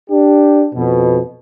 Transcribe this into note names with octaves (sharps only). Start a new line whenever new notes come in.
D4 G4
F2 B2